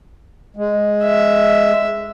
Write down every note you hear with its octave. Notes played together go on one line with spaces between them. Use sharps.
G#3
E5